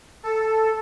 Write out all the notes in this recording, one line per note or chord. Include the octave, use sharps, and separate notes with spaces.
A4